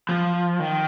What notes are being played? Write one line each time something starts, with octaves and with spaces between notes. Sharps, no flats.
F3
D#3